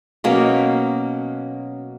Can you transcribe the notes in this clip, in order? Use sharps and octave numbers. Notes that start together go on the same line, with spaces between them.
B2 F#3 A#3 C#4